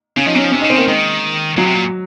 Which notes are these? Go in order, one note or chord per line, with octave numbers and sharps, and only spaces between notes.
C#3 C#4
F3 D#4
F#3 C#4
F3
C3 C#4
C#3 D#4
C4
D#3 A#3
D#3 G#3
C#3 F#3
C3
A#2